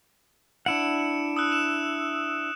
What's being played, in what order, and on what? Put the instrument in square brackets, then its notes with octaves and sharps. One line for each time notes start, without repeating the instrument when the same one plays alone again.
[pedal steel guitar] D4 E4 F#5 [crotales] C#7 D7 E7
[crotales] D#6 E6 F#6
E7